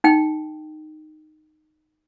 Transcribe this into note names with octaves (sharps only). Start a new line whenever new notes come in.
D#4 G5